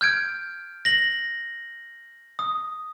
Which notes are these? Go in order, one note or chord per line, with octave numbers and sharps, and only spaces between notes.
F6 G6 G#6 D7
A#6 F#7
D#6